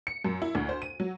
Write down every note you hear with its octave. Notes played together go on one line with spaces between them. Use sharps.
C#7
F#2
E4
D2
C5
D#7
F#3